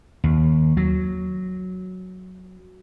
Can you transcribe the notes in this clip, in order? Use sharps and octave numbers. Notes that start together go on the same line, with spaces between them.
D#2
F#3